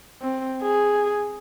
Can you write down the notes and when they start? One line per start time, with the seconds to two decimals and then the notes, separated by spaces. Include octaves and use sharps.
0.22 C4
0.62 G#4